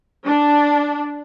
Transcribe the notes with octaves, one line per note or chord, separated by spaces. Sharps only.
D4